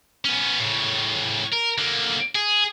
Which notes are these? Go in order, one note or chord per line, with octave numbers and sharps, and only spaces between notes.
B3 C#4
A2 C#3
A#4
D3 A#3
G#4